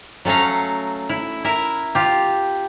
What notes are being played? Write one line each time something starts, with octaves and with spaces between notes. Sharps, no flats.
F#3 A3 C#4 F5 A#5
E4
E4 A#4 E5
F4 G4